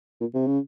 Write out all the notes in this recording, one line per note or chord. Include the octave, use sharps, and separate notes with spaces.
A#2
C3
C#3